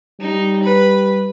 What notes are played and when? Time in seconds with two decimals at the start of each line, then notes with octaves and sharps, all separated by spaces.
0.20 G3 D#4
0.63 B4